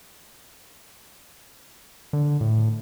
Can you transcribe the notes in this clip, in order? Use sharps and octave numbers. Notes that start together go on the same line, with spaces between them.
D3
A2